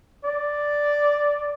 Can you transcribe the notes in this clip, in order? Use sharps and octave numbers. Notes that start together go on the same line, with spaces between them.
D5